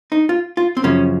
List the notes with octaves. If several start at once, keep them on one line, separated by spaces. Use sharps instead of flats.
D#4
F4
F4
C4
F#2 C#3 F3 C#4